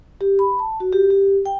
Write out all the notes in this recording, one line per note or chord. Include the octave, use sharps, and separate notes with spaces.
G4
B5
A5
F#4
G4
G4
G5